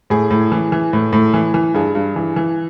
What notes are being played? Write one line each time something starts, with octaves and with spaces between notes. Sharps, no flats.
A2 G#4
A2
E3
E3
A2
A2
E3
E3
G2 G#4
G2
E3
E3